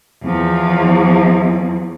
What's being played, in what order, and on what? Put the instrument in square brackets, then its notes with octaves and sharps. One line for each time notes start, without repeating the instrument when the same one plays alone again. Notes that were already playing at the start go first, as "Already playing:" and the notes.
[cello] E2 F3